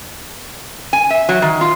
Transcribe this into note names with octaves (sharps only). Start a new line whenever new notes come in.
G#5
E5
F#3
D#3
F4